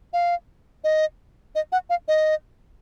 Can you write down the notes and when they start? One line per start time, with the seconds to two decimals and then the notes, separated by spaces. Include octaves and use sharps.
0.13 F5
0.84 D#5
1.55 D#5
1.72 F#5
1.90 F5
2.08 D#5